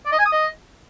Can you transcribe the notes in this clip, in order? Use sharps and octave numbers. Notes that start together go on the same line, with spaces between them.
D5
D#5
G#5
D#6
D#5